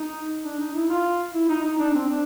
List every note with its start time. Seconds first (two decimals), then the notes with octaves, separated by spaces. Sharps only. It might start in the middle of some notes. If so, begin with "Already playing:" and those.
Already playing: D#4
0.45 D4
0.60 D#4
0.75 E4
0.90 F4
1.35 E4
1.49 D#4
1.64 D#4
1.79 D4
1.94 C4
2.09 D4